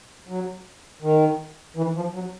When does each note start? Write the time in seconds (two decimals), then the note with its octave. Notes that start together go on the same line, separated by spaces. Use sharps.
0.28 F#3
1.02 D#3
1.77 E3
1.95 F3
2.14 F#3